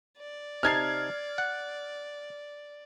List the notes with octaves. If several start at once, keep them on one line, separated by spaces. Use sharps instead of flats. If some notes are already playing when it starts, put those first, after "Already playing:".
D5
C3 D#4 A5 F6 G#6 C7
F#5